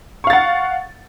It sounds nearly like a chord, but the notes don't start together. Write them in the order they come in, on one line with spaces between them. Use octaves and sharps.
C#6 F5 A6 F#5